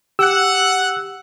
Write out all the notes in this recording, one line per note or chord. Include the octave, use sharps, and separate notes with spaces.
G4 F#5 E6 F#6